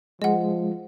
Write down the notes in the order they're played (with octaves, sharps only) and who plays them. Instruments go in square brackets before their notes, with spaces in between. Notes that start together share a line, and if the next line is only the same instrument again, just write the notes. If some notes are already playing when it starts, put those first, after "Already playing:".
[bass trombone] F3 [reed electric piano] G#3 [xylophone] D#5 F#5